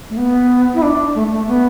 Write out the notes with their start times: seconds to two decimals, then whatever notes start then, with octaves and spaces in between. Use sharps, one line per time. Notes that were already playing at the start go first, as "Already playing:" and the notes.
0.10 A3
0.17 B3
0.74 E4
0.82 D4
1.15 A3
1.31 A3
1.48 B3